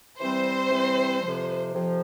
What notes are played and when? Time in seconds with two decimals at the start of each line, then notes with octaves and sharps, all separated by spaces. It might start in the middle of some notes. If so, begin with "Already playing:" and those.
0.20 C3 E3 G3 C4 C5
0.70 C3 E3 G3 C4
1.21 F2 C3 F3
1.74 F2 C3 F3